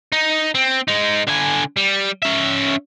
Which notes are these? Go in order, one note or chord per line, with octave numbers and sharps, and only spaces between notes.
D#4
C4
G#3 D#4
D3 G#5
G3
C#4 E5